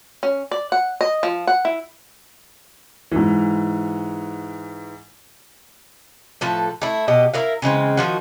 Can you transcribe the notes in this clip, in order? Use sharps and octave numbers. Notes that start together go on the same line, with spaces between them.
C#4
D5
F#5
D#5
F3
F#5
E4
G#2 E3
A2 F3 A4 B4
A3 E4
B2 G4 D#5
E4 A#4 F5
C#3 E3 G#3 C4
D#3 F3 F#4